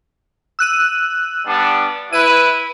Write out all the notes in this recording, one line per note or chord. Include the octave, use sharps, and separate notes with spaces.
E6 F#6 D#7
G3 B3 D4
E4 B4 D#7